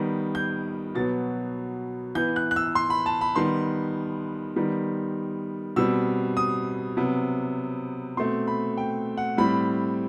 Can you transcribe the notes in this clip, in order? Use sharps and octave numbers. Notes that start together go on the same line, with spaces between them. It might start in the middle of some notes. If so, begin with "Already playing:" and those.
Already playing: D#3 G3 B3
G6
B2 F#3 B3 A6
E3 B3 G6
F#6
F#6
E6
C6
B5
A5
B5
D#3 G3 B3 C6
D#3 G3 B3
B2 G3 C4 E6
D#6
C3 F#3 B3
B2 A3 C4 C6
B5
G5
F#5
A2 G3 C4 B5